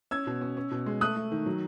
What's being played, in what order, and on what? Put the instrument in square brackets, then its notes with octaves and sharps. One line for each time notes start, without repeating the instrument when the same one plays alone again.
[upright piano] C#4 E6 G#6
B2
C#4
C#4
B2
G#3
A3 D#6 F#6
A3
D#3
F#3